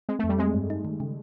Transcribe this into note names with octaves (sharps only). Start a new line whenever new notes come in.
G#3 C4
A3
F2
G3
G#3 C4
G2
D#4
D#3
C#3